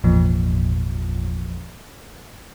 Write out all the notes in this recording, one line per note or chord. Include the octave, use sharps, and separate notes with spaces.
G#1 E2 A#2 F3